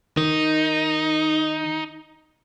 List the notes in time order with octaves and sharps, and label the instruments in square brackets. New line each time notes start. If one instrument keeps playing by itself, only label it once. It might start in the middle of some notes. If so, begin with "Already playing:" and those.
[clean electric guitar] D#3 [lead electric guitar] D#4